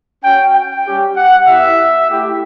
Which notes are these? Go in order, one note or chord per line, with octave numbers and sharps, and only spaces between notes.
C#4 F#4 G5
G5
G3 C#4 G4
F#5
B3 E4 G4 E5
A3 E4 G4